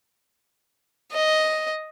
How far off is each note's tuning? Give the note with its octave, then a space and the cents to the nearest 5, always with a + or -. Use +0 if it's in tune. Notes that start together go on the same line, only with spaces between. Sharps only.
D#5 +5